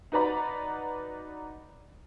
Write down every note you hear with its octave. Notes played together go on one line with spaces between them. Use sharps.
D#4 F#4 B4 D5 A#5 B5